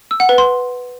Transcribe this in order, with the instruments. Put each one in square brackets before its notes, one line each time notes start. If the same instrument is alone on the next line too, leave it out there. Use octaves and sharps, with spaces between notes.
[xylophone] E6
F#5
B4
C6